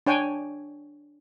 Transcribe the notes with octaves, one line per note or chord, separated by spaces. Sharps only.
D4 C#5 G5 G#5